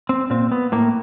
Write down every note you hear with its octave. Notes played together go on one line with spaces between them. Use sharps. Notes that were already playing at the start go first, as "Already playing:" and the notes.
C4
A#2 C4
B3
A2 A#3